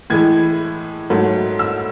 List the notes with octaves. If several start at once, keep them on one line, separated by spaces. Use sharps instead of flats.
A2 E3 G#3 G#6
G#2 F#3 A3
E6